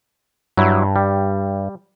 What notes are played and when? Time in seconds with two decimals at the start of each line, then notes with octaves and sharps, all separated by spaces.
0.57 G2 F#3 E4
0.96 G3